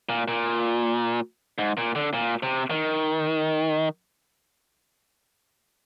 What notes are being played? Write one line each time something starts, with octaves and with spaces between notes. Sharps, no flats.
A#2
A#2
G#2
A#2
D3
A#2
C3
D#3